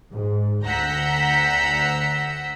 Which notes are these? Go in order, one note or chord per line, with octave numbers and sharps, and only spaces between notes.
G#2
D2 F#5 A#5 E6 G6 B6